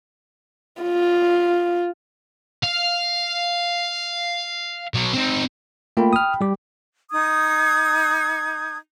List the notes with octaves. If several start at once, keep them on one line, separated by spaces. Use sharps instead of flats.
F4
F5
B2 F#3
C4 D#4
A3 A#3 F4 G5 B5
D#6 F6
G3 G4
D#4 D#6 G#6